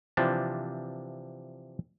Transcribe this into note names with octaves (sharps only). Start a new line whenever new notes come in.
C3 E3 F3 D4